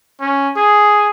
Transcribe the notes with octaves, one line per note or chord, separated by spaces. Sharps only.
C#4
G#4